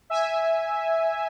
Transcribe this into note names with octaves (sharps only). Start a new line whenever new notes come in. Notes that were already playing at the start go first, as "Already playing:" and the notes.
E5 G#5